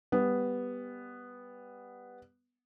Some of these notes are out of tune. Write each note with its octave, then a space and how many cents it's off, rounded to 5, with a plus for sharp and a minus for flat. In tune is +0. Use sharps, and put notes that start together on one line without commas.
G3 +15 B3 +0